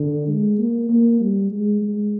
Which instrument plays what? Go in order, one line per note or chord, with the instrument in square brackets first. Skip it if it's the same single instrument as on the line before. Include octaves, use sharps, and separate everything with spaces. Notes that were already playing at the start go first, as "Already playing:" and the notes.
Already playing: [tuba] D3
G#3
A#3
A#3
G3
G#3
G#3